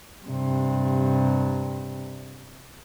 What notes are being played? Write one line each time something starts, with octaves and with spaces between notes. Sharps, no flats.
G2 C3